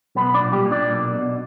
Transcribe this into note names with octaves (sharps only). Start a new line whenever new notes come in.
B1 B3 B4
D4 D5
A#2
G3 G4
A#2
D4 D5
B1
B2